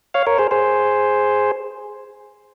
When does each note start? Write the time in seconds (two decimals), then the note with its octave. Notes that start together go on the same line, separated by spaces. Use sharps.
0.14 C#5 F5
0.26 A#4 C#5
0.38 G#4 C5
0.51 G#4 C5